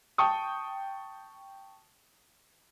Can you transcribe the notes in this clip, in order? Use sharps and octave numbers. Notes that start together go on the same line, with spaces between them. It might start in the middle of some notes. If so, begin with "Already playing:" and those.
G5 A5 C#6 D#6